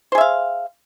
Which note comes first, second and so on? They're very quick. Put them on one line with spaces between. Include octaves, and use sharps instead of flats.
C5 G#4 E5 F5